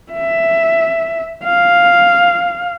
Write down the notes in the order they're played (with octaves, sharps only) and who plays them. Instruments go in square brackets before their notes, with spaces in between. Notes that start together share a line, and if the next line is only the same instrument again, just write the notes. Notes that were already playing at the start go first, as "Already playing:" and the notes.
[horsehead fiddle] E5
F5